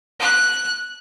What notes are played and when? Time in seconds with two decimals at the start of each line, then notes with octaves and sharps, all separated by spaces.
0.19 F#6